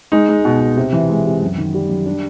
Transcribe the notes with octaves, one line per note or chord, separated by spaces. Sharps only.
G#3 D#4
G#3
B2
B2
C3
E3
G#3
C3
F#2
D#3
G3
F#2
G3 D4